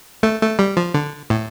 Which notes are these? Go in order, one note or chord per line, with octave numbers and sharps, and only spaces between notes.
A3
A3
G3
F3
D3
A2